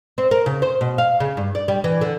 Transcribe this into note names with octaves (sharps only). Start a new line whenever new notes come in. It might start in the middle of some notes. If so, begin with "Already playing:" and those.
C4
A#4
C#3
C5
B2
F5
C#3
G2
D5
G3
E3
D3